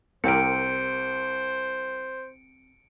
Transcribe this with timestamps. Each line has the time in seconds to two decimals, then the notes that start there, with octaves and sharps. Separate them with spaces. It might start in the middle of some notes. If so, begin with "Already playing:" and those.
0.24 C2 C4 G4 A#4 C5 C#7 D7